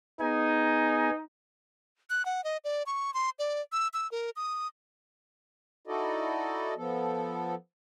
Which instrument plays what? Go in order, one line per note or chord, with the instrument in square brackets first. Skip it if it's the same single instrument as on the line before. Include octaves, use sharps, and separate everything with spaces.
[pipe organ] B3 G#4 G#5 [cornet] D#4
[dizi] F#6
F#5
D#5
D5
C#6
C6
D5
E6
E6
A#4
D#6
[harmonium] D#4 E4 F#4 A4 D5 D#5
F3 B3 A4